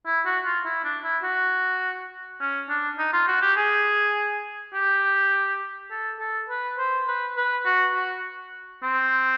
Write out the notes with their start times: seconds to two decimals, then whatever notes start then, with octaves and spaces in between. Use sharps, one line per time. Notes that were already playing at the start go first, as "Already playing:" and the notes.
0.07 E4
0.26 F#4
0.45 F4
0.65 E4
0.84 D4
1.04 E4
1.23 F#4
2.41 C#4
2.69 D4
2.98 D#4
3.13 F4
3.28 F#4
3.42 G4
3.57 G#4
4.74 G4
5.91 A4
6.20 A4
6.49 B4
6.78 C5
7.08 B4
7.37 B4
7.66 F#4
7.95 F#4
8.83 C4